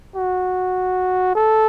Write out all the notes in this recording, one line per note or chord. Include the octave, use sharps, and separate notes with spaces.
F#4
A4